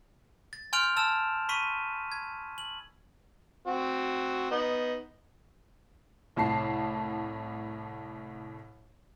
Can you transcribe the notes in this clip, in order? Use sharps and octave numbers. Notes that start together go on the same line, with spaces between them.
A6
G#5 C6 F6 G6 D7 F7
A5 E6 F6 A6 E7
B5 C#6 B6 D#7
G#6
F#7
C4 F#4
B3 D#4
C2 A2 A5 C7